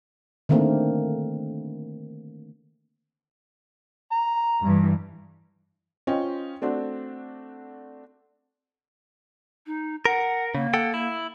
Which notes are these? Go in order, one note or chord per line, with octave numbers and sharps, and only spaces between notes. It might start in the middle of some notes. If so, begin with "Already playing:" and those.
D3 D#3 A3 A#3 C4
A#5
G2 E3
C#4 F4 C5 D#5 G5
A3 C4 D4 F#4
D#4
A#4 F#5
C#3 A#3
A4 F#5 G5
E4